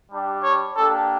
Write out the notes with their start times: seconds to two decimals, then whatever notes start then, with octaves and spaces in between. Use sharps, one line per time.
0.10 G3 D4 G4
0.43 C#5
0.76 A#3 D4 G4 A4